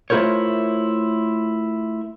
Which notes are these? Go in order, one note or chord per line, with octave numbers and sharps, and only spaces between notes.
A3 E4 F4 A#4 C5 C#5